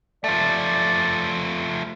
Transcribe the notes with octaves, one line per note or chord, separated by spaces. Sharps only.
F3 A3 D5